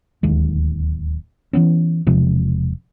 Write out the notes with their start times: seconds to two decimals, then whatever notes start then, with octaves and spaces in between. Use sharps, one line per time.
0.23 D1 D#2 G#3
1.53 E3 F#3 B3 C#4
2.07 E1 C3 F3 G#3